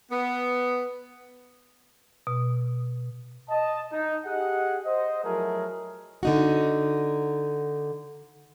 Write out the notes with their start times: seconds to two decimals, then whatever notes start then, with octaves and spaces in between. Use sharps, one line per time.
0.11 B3
2.27 B2
3.50 D#5 A5
3.92 D#4
4.26 G4 G#4 D#5 F#5
4.86 C5 D#5
5.24 F3 F#3 A3 E4 G#4 A#4
6.23 D3 D#4 F#4